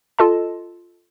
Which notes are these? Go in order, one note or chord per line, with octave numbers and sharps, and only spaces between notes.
F4 A4 D#5 A5